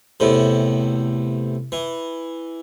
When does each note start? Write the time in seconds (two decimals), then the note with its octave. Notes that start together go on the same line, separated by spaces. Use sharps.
0.20 E2 A2 C3
1.72 E3